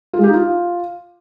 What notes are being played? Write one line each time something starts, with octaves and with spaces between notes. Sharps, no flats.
F4
G#3
G4
D#4
F4